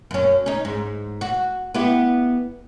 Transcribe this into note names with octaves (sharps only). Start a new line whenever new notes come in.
F#2 C#4
C#4 D#4
G#2
F#4
B3 E4 G4